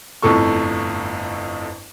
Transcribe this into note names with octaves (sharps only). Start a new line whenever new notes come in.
G1 F2 A2 A4 C#6